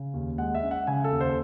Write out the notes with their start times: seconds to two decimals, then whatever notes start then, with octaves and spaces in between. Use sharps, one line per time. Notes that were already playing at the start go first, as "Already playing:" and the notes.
Already playing: C#3
0.14 D#2
0.38 G#3 F#5
0.55 E5
0.63 C#4
0.71 F#5
0.87 C#3 G#5
1.04 A4
1.12 D#2
1.21 C5